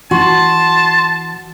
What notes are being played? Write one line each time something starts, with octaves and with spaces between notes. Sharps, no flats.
E3 F#4 A5 C6